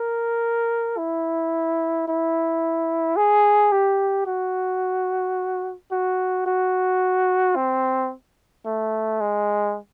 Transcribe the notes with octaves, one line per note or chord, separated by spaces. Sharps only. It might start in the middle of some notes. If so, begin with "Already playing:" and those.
Already playing: A#4
E4
E4
G#4
G4
F#4
F#4
F#4
C4
A3
G#3